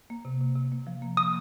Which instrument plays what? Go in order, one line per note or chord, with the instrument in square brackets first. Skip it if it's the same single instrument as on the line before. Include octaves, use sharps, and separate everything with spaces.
[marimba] A#3
C3
C3
C3
A#3
F3
A#3
[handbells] D#6